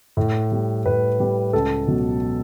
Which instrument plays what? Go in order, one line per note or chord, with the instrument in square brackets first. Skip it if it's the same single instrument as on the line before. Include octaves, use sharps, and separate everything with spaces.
[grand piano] A2
G3
A2 B4
G3
C#2 A4
B2 F#3